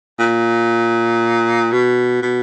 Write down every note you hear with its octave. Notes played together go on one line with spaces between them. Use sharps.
A#2
B2
B2